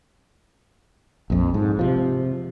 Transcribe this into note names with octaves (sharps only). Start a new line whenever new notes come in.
A#1 F2
G#2
C3 F3